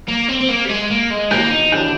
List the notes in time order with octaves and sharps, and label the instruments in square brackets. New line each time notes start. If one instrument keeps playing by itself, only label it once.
[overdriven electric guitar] A#3
C4
C4
A#3
G3
G#3
A#3
G#3
[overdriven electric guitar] A#3 [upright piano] G6
[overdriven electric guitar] D#4
[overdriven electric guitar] D4 [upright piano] G6